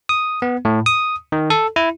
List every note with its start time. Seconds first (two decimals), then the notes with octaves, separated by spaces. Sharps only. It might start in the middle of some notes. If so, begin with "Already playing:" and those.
0.09 D#6
0.42 B3
0.65 A2
0.86 D#6
1.32 D#3
1.50 A4
1.76 E4